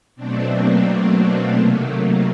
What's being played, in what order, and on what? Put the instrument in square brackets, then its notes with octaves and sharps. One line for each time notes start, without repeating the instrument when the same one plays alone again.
[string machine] B2 F#3 A3 C4 D4
A#3 C4
A#3 C4
A#3 C4
C3 D#3 F#3 A3 A#3
A3